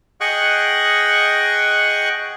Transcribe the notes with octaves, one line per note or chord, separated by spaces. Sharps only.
G#4 D#5 F#5 G5 C#6 F#6